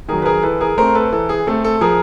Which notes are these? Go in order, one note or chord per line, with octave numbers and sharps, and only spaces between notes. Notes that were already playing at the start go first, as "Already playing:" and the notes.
D#3 F#3 G#4 A#4
B4
G#4 A#4
E3 A4 B4
G#4 A#4
A3 C4 A#4 C5
A4 B4
E3 A4
G#4
A3 C4 A4
A4
F3 G#4 A#4